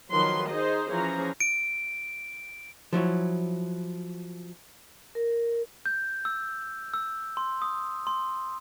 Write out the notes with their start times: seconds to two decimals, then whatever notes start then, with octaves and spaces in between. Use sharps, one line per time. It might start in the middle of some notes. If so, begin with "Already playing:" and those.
0.11 D#3 F3 F#3 B4 C6
0.48 D#4 G#4 C5 D#5
0.91 E3 F3 C#4 G#4 C5 A#5
1.40 D7
2.93 F3 F#3 E4 C#5
5.15 A#4
5.86 G6
6.25 E6
6.94 E6
7.37 C6
7.62 D#6
8.07 C6